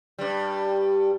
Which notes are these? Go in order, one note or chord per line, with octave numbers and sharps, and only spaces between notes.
G2 G3